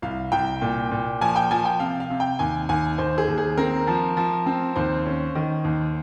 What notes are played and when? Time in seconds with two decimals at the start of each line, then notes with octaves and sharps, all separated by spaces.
0.02 C2 F5
0.32 C2 G5
0.62 A#2
0.91 A#2
1.21 F3 G#5
1.36 G5
1.51 F3 G#5
1.65 G5
1.80 C3 F5
2.00 F5
2.10 C3
2.20 G5
2.39 D#2 G#5
2.69 D#2 G#5
2.98 D#2 C5
3.18 G#4
3.28 D#2
3.38 G#4
3.57 C4 A#4
3.87 F3
4.17 F3
4.46 C4
4.76 D#2 C5
5.06 C#4
5.35 D#3
5.64 D#2